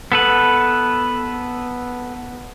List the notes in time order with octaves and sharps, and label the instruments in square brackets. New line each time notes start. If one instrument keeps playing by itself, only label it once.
[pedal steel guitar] B3 A4 B4